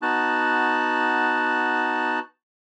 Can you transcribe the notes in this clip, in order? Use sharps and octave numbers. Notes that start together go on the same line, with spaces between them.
B3 D#4 F#4 A5 F#6